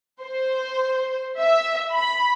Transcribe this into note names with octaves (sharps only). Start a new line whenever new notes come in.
C5
E5
B5